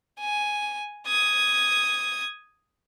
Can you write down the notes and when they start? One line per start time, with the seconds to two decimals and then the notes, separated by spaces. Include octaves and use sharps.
0.20 G#5
1.07 D#6 G#6